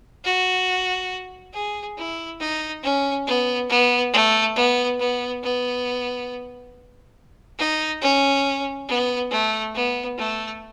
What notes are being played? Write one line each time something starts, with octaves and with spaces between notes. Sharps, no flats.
F#4
G#4
E4
D#4
C#4
B3
B3
A3
B3
B3
B3
D#4
C#4
B3
A3
B3
A3